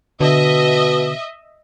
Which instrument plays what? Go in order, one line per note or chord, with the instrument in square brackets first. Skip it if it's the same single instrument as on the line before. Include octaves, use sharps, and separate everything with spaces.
[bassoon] B2 [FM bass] D3 [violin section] D#5 E5